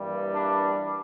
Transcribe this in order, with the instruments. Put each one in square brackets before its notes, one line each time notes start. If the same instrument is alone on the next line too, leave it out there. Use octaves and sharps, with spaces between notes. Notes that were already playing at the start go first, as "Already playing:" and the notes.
Already playing: [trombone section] G2 E3 G3 A#3
D4